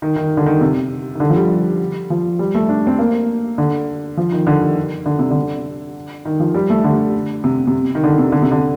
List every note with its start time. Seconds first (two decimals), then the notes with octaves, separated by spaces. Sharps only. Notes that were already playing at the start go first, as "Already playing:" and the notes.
0.02 D#3
0.16 D#3
0.37 D3
0.46 D#3
0.61 C3
1.15 D#3
1.20 D3
1.30 F3
1.36 G3
2.10 F3
2.39 G3
2.54 A3
2.69 D4
2.87 C4
2.98 A#3
3.58 D3
4.17 F3
4.32 D#3
4.47 D3
4.62 D#3
5.06 D3
5.19 C3
5.31 D3
6.25 D#3
6.40 F3
6.54 G3
6.70 A3
6.84 D3
7.44 C3
7.67 C3
7.95 D#3
8.04 D3
8.18 C3
8.32 D3
8.42 C3
8.51 D3